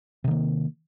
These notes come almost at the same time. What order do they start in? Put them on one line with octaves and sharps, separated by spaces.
C3 D#3 A#3